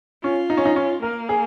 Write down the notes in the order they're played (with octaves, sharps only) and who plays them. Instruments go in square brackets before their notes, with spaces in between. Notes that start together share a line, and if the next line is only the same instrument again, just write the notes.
[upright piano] C#4 [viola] F4
[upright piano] D#4
C#4
D#4
C#4
[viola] A#3 [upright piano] A#4
[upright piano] G#4